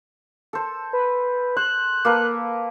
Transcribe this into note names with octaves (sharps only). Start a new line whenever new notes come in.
A4 C5
B4
C5 F#6
A#3 A4 B4